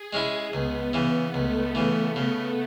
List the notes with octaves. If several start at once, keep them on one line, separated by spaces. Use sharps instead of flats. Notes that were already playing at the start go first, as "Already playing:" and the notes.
Already playing: G#4
G#3 C#4 E4
C#2 B3
C#3 E3
C#2 A3
C#3 E3
C#3